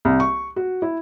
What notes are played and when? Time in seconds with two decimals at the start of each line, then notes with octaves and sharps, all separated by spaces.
0.05 C2
0.20 C#6
0.56 F#4
0.82 E4